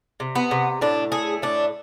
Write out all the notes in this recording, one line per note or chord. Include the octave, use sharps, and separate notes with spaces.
C3
B3
C3
A2 D4
A3 G#4
A2 D4